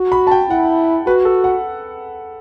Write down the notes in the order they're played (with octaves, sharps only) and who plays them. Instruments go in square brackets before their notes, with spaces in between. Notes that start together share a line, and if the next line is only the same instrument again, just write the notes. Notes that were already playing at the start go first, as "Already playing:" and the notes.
Already playing: [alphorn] F#4
[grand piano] B5
A5
G5
[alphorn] E4 [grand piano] F#5
[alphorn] F#4 [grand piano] B4
[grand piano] A4
F#5